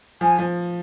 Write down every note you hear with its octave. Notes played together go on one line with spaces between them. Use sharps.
F3 G#5
F3